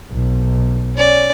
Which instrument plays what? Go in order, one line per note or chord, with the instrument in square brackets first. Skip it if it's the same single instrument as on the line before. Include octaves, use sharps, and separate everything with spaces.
[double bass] B1
[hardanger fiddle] C#4 D5